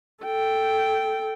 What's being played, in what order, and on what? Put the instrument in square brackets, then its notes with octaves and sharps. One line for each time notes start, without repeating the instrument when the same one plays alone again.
[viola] A4 G5